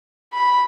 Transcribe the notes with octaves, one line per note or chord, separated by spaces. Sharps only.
B5